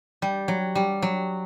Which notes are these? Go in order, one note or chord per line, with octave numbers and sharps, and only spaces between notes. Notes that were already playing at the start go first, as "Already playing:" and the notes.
G3
F#3
G3
F#3